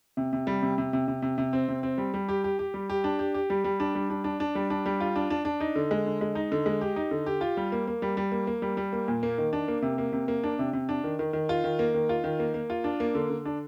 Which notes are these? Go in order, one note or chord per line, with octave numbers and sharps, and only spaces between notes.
C3
C3
G3
C3
C3
C3
C3
C3
C3
C4
C3
C4
G3
G3
G4
G4
G4
G3
G4
D4
G4
G4
G3
G3
D4
G3
D4
D4
D4
G3
D4
G3
F4
D4
D4
D4
D#4
D3
G#3
D3
G#3
D#4
D3
G#3
G4
D#4
D3
G4
F4
G3
A#3
A#3
G3
G3
A#3
A#3
G3
G3
A#3
A#2
A#3
D#3
D4
A#3
C3
A#3
C3
A#3
D4
C3
C3
D4
D#3
D#3
D#3
F4
D#3
A#3
D#3
F4
D#3
A#3
A#3
F4
D4
A#3
D3
D3
D4